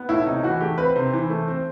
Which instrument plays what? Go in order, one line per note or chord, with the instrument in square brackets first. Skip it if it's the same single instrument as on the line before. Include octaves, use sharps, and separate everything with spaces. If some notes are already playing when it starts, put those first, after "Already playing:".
Already playing: [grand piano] B3
A2 E4
C3 D#4
E3 F#4
A3 G4
C4 B4
C3 C5
E3
A3
C4